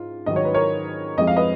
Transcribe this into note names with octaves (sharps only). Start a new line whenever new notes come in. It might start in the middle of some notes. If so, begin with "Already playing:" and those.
Already playing: G#2 F4
G#2 D#3 F#3 D#5
C#5
B4
A#4 C#5
F2 F3 G#3 D#5
F5
B4 D#5